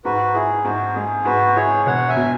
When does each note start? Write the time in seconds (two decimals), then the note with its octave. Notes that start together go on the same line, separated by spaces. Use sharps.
0.05 G#2 F#4 B4
0.34 E4 G#4
0.65 G#2 F#4
0.95 G#3 G#4
1.25 G#2 F#4 B4
1.56 E4 G#4 C#5
1.86 E1 C#5 F#5
2.08 E5 G#5
2.16 B2